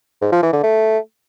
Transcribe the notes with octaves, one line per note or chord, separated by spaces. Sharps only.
G#2
F3
E3
D3
A3